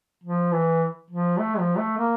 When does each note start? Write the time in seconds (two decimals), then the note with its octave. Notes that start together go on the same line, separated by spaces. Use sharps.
0.24 F3
0.53 E3
1.10 F3
1.39 A3
1.59 F3
1.77 A3
1.97 A#3